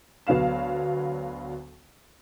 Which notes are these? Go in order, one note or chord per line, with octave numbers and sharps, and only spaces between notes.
D2 F#3 B3 F5 E7